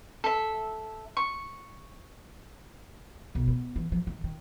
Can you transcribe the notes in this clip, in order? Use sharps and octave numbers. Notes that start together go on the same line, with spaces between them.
A4 E5
C#6
B1
B3
E3
F3
D#3
D#3